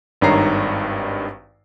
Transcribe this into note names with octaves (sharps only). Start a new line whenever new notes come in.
G#1 G2 D#3 C#5 A#5 C7